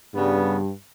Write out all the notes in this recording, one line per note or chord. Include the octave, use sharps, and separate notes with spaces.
G2 C#3 G3 B3